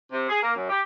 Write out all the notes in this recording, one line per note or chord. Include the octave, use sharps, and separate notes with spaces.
C3
G#4
A#3
F#2
G4